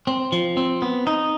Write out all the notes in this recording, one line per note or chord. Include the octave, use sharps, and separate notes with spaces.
C4
F3
C4
B3
D#4